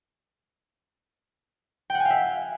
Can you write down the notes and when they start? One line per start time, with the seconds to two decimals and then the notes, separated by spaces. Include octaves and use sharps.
1.90 G5
1.95 F#5
2.00 G#5
2.05 F5
2.10 E5